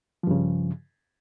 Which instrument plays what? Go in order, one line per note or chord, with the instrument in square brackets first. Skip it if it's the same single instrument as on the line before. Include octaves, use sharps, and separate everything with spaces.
[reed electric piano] F3
G2
C#3